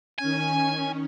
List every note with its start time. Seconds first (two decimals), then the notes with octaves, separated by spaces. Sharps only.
0.18 D#3 C#4 G#5